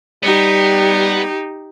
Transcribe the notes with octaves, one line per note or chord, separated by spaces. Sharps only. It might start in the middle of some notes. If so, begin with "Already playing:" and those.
G3 B3 D#4 G4